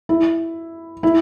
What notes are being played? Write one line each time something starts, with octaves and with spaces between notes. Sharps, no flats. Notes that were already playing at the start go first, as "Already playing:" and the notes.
E4
E4